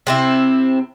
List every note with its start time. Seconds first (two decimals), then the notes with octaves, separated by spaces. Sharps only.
0.07 C3 C4 E4